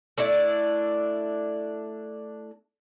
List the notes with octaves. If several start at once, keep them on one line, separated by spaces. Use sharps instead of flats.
A3 D4 E4 D5